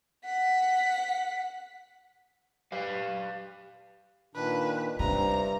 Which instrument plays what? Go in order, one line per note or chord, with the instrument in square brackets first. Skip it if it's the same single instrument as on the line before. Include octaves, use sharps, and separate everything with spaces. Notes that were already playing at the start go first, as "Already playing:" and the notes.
[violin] F#5 B6
[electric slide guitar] G4 B4 F5
[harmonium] A#2 D#3 D4 [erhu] B4
[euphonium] G2 [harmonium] C3 [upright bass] C#4 D4 [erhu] A#5